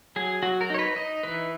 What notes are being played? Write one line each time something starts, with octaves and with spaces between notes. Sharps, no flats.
F#3 G#4
F#3 F#4
A#4
D#4 C#5
B4
D#4 D#5
E3 B4